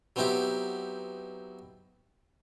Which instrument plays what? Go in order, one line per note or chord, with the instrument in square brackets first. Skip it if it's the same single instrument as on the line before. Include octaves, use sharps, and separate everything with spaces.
[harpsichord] F#3 B3 C4 D#4 E4 G4